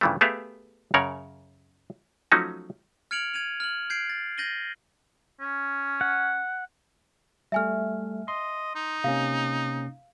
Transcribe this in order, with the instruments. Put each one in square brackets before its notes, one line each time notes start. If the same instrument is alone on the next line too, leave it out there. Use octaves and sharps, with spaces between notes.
[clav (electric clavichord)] G2 C#3 E3 F3 A3
A3 B3 G4 G#4 E5 F5
F#2 C#3 A#4 C#5 F#5
F3 F#3 A3 C#4 D#4 F#4
[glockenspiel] F6 G#6 C#7 D7 F7 F#7
G#6 D#7 F7
F6 F#7
G6 G#6 C7 D7
A6
G6 A6 A#6 D#7 F#7 G7
[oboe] C#4
[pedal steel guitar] F#5
[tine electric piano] G3 A3 [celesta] E5 G#5 F6
[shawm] D#5 [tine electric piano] C6
[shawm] D#4
[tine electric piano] C3 A#3 C#4 [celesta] F5